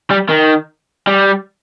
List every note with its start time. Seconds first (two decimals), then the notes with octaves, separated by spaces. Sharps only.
0.11 G3
0.29 D#3
1.07 G3